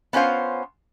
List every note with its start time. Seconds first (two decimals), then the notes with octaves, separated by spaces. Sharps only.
0.13 B3 C#4 F4 C5 F5